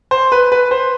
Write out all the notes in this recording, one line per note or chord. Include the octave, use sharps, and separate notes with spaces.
C5
B4
B4
C5